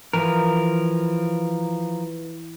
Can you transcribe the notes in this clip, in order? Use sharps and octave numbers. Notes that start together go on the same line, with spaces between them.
E3 F3 A#4